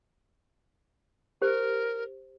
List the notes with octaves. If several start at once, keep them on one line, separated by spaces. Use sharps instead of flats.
G4 A#4 C5